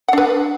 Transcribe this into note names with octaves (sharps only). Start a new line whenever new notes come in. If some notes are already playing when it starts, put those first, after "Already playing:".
D4 B4 F#5